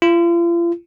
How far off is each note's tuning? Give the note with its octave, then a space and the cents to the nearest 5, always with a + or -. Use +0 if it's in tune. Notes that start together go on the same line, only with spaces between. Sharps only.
F4 -40